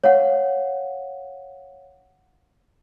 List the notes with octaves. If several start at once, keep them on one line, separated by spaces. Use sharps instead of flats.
C#5 F5 F#5